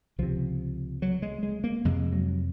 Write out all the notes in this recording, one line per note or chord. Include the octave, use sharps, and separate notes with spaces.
C#2 C3 F3
F#3
G#3
G#3
A#3
F2 C3 G#3
F#3